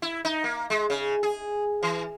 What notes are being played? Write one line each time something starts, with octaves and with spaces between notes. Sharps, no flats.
E4
D#4
A#3
G#3
C#3
G#4
E3